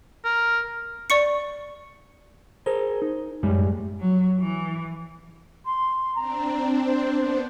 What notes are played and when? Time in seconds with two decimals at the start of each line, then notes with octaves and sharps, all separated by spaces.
0.25 A#4
1.10 D5 C#6 C#7
2.66 G#4 A#4 C5
3.02 D#4
3.43 F#2 A2 G3 G#3
4.00 F#3
4.39 E3
5.65 C6
6.15 C4 D4 A#5
6.85 C5
7.16 B3 D4 C5